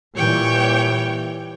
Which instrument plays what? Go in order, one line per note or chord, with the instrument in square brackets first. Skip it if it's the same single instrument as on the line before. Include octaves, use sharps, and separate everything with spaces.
[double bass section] A#2 E3 G3 [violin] C#5 G5